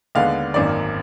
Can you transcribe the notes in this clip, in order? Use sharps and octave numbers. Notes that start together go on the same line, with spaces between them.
D#2 D3 G#3 B3 F5
G#1 F#2 D#3 A#3 D5